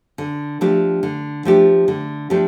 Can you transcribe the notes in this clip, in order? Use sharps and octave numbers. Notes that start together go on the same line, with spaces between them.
D3
F3 A3 D4 G4
D3
F3 A3 D4 G4
D3
F3 A3 D4 G4